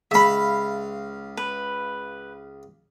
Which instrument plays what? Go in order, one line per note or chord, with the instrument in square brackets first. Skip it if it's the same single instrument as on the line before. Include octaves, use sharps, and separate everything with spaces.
[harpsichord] C#2 F5 [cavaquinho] E5 B5
[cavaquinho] B4